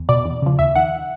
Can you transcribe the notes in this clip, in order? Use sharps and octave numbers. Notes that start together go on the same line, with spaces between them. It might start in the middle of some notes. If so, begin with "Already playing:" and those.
Already playing: E2
B2 D5
E2
C#3 F3
D#2 E5
D#3 F#5